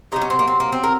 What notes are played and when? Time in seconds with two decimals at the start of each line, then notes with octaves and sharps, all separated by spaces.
0.12 C3 D#3 F#3 D#4
0.22 C#4
0.30 C4
0.39 A#3
0.48 C4
0.60 A#3
0.72 C4
0.84 A#4